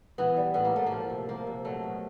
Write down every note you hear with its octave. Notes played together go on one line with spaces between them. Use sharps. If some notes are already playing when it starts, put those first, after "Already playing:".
E3 B3
G3
A2 B3
A#3
A2 A3
A#3
F3
C3
F3 A#3
C3
F#3 A3
B2